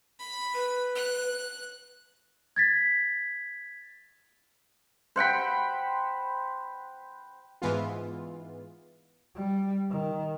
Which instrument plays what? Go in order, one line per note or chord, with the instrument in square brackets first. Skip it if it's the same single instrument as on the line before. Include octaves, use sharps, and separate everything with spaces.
[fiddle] B5
[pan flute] B4
[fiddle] F#6
[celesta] G#6 A6 B6
[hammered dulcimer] C5 F#5 G5 B5
[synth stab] G#2 E3 G#3 B3 F4
[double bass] G3
D#3